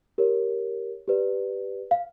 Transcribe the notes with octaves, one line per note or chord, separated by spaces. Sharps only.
G4 A#4 C#5
G4 B4 D5
F5